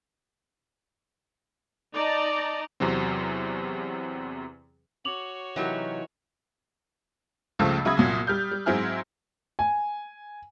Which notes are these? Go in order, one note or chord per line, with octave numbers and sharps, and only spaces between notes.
D#4 D5 D#5 A5 A#5
E2 C3 F#3 C4
F#4 C#5 D6 F7 F#7
C3 E3 F#3 D#4 G4 A#4
C#2 G2 C#3 F3 A3 E6
C#3 F#3 E5 B5 D#6 G#6
C2 A#2 F#3
G3 F6 G6
G3
G#2 F#3 C4 E4 G#4 F6
G#5